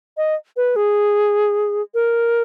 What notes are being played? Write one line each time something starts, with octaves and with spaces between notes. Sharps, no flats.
D#5
B4
G#4
A#4